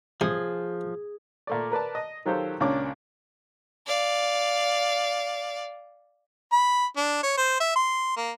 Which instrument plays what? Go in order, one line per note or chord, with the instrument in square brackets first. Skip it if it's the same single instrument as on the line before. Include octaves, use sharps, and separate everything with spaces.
[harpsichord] C3 [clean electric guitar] F3 [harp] G#4
[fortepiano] A#2 A3 D5
A#4 B4 D5 A5
D#5
D#3 F#3 F4 G4 A4 C5
C#2 A#2 C#4 D4 C#5 D6
[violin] D5 F5
[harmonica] B5
D4
C#5
C5
E5
C6
A#3